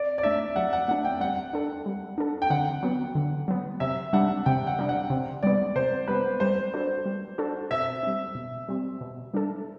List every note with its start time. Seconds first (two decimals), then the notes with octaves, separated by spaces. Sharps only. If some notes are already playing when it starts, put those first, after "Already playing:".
Already playing: D5
0.18 D5
0.23 A3 D4 E5
0.56 F#3 F#5
0.73 F#5
0.88 A3 D4 F#5
1.05 G5
1.20 G3 F#5
1.53 D4 A4
1.86 G3
2.18 D4 A4
2.42 G5
2.50 D3 F#5
2.83 F#3 B3
3.15 D3
3.48 F#3 B3
3.80 C3 E5
4.13 G3 D4 F#5
4.46 C3 G5
4.67 F#5
4.79 G3 D4
4.89 F#5
5.10 C3
5.43 G3 B3 D5
5.76 C3 C5
6.08 G3 B3 B4
6.40 G3 C5
6.74 D4 F#4 A4
7.06 G3
7.38 D4 F#4 A4
7.71 B2 E5
8.03 G3 C4
8.35 B2
8.69 G3 C4
9.01 B2
9.34 G3 D4 A4